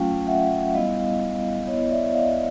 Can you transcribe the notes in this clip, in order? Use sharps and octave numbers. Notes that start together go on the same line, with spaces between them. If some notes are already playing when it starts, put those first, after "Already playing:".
Already playing: F#3 A3 C#4 F4 F5 G5
E5 F#5
G3 B3 E4 D#5 F5
B3 E4 C#5 D#5
D5 E5
D#5 F5